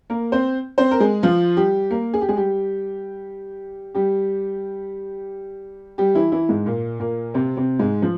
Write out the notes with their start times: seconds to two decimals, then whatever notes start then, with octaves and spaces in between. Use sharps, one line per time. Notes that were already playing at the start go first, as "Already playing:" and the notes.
0.10 A#3 A#4
0.32 C4 C5
0.78 C4 C5
0.91 A#4
1.00 G#3 G#4
1.23 F3 F4
1.57 G3 G4
1.91 A#3 A#4
2.14 G#4
2.21 G4
2.29 G#3 G#4
2.36 G3 G4
3.95 G3 G4
5.98 G3 G4
6.15 E3 E4
6.32 E3 E4
6.49 G#2 G#3
6.66 A#2 A#3
7.00 A#2 A#3
7.34 C3 C4
7.57 C3 C4
7.79 G#2 G#3
8.02 F3